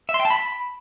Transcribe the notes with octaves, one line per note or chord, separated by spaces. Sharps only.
E5
C6
G5
A5
B5